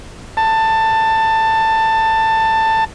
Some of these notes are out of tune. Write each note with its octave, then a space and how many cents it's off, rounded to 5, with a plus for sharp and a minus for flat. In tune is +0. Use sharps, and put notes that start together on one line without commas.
A5 +15